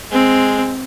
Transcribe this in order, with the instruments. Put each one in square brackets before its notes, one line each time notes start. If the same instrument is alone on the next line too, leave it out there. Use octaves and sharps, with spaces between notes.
[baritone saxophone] G#3 [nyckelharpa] C4